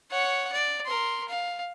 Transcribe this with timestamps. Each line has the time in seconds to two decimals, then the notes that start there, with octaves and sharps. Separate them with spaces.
0.11 C#5 F#5
0.52 D5
0.86 A#4 C6
1.29 F5